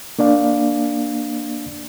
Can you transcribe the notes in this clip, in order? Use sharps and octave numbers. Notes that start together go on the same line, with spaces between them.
A#3 D4 D5 F5